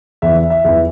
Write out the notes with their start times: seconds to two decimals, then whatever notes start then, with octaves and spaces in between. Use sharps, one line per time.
0.22 E2 E3 E5
0.36 E5
0.50 E5
0.65 E2 E3 E5